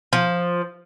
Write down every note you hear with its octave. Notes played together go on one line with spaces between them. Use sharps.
F3